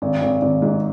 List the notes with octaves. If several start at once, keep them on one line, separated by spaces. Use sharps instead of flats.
G#1
G#1
G#1
G#2